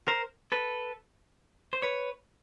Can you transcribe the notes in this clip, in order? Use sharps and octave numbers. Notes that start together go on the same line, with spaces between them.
A#4 C5
A4 B4
C5
B4 C#5